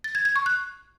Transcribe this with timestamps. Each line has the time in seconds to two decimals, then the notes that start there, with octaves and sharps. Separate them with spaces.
0.04 A6
0.15 G#6
0.25 G#6
0.36 C#6
0.46 F#6